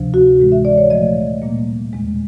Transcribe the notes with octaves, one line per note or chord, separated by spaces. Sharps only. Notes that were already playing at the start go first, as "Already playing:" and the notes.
Already playing: D2 C3 F3
F#4
A2 E3 G#3
E5
D5
C#5
A#2 F3 A3 D#5
A#2 G3 A#3
E2 B2 G#3